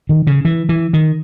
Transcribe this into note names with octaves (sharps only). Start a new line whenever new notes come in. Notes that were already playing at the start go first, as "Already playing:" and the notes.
D#3
C#3
E3
E3
D#3